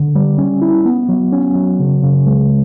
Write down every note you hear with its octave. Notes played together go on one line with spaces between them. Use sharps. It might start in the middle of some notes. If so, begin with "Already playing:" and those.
Already playing: D3
G3
C#4
E4
B3
F#3
C#4
F#3
C#3
C#3
G#3